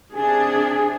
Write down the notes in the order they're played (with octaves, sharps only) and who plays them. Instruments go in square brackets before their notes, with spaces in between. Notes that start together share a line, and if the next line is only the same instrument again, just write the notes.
[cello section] C3 D4 [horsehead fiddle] G#4 [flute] G#5